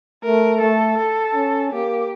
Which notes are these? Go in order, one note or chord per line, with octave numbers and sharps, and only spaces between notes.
A3 A#4
A3 A4
A4
C#4
A#3 G4